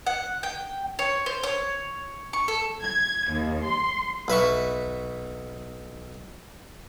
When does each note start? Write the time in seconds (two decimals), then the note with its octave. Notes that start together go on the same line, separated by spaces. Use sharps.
0.07 F#5
0.43 G5
0.99 C#5
1.26 C5
1.43 C#5
2.33 C#6
2.48 A4
2.81 G#6
3.30 D#2
3.64 C6
4.28 B1 B4 E5 C#6